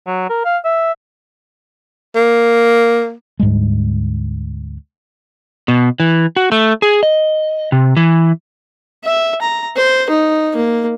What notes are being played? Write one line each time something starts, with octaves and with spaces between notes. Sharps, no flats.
F#3
A#4
F5
E5
A#3
D2 G#2 G3 G#3
B2
E3
F#4
A3
G#4
D#5
C3
E3
E5
A#5
C5
D#4
A#3